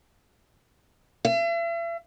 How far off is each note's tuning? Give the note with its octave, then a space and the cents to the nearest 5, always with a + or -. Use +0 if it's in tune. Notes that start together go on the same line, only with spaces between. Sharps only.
E5 +40